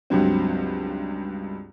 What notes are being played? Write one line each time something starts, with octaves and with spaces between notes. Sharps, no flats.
C#2 G2 F#3 C4